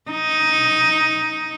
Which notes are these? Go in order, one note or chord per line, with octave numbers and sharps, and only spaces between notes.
D#4